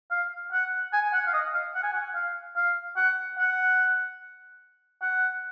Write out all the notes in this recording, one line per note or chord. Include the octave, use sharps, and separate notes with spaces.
F5
F#5
G#5
F#5
F5
D#5
F5
F#5
G#5
F#5
F5
F5
F#5
F#5
F#5